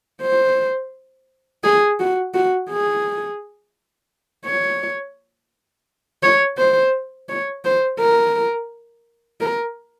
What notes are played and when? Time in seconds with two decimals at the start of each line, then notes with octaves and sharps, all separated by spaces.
0.22 C5
1.64 G#4
2.00 F#4
2.34 F#4
2.70 G#4
4.46 C#5
6.23 C#5
6.58 C5
7.29 C#5
7.65 C5
7.99 A#4
9.41 A#4